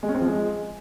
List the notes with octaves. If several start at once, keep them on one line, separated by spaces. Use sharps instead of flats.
G#3
C#4
C4
F3
G#3